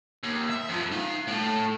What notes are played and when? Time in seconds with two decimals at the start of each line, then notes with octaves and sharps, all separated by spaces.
0.24 D#2
0.50 E5
0.69 F2 F3
0.92 D#4 F5
1.28 A2 A3